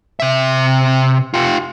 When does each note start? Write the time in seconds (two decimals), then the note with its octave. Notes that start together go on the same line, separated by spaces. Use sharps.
0.20 C3 E5
1.34 F4 G4